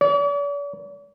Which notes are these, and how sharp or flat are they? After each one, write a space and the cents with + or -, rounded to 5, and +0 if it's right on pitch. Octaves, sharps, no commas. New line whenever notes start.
D5 -45